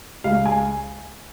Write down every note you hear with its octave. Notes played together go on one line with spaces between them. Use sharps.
C#2 F5
G#5